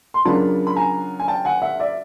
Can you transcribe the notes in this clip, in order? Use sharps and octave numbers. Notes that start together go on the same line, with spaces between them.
C6
C#3 F#3 A#3 D4 F4 A5 B5
B5
G#5 A#5
G#5
G5 A5
F#5 G#5
E5 F#5
D5 E5